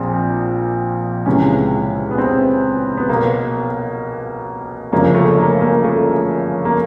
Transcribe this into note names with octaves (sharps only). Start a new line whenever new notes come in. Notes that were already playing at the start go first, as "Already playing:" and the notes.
Already playing: A#1 A#2 F3 C4
C#2 C3 E3 C#4
B3
C4
B3
B1 B2 A#3
G1 F#2 C#3 F3 A#3
A3
A#3
A#3
A3
A#3